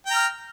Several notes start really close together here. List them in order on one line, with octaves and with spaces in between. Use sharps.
G5 A#5 F6